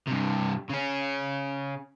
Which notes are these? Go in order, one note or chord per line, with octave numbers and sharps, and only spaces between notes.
G2 C3
C#3 C#4